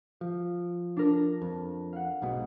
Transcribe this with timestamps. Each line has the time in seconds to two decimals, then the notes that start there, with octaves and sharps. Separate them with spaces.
0.21 F3
0.97 D4 A#4
1.42 F2
1.93 F5 F#5
2.22 B1 G#2 B2